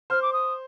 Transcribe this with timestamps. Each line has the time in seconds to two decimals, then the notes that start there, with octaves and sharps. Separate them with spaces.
0.10 C5 F6
0.22 D6
0.33 D#6